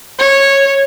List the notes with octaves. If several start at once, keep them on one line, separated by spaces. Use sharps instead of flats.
C#5